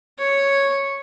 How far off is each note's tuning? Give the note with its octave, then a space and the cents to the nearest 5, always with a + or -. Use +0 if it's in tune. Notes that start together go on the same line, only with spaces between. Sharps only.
C#5 -5